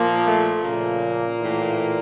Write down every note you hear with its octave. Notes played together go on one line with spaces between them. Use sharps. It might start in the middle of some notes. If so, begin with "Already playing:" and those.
Already playing: A#2 F3 A#3
A3
A#2 C#3 F3 A#3
A2 E3